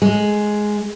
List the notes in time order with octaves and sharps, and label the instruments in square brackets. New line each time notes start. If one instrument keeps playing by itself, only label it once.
[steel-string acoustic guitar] G#3